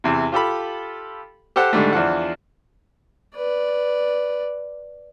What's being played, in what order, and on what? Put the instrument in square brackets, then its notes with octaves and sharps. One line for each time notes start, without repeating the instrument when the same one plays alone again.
[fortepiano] E2 C3
F4 G4 A4 B5
G4 A4 C5 F#5
G#2 D3 G3 A3
E2 F3 D4 F#5
[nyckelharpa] B4 D5